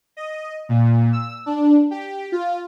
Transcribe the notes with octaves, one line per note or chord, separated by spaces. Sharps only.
D#5
A#2
E6
D4
G4
F4